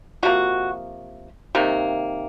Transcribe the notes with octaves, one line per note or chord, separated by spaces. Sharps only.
C3 F3 A#3 F#4
C3 D#3 A#3